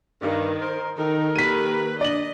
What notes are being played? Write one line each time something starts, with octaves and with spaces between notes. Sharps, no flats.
G2 D#3
A#4 C5
D#3 D#4 A4 A#4
D#3 A#3 G4 B4 B6 D#7
D4 D5 D#5 F#7